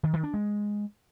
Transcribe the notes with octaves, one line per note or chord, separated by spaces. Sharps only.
D#3
D#3
D4
G#3